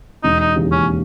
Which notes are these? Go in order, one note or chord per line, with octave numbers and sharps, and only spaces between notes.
E1 D#4
D#4
D#2 C#3 E3
C#4